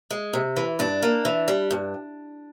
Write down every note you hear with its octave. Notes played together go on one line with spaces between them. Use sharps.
G#3
C3
E3
G2 D4
A#3
E3
G3
G2